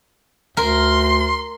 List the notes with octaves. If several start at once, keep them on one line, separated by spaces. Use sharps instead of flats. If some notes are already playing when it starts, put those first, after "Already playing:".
D2 A#4 C6